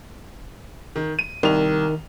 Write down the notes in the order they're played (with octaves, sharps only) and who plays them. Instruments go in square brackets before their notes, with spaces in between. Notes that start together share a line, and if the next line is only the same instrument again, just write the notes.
[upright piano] D#3
D#7
[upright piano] C2 F7 [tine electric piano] D#3